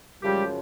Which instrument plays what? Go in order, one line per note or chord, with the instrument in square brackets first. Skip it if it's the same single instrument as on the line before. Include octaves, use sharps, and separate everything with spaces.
[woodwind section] F#2 C#3 F3 G3 G#3 G4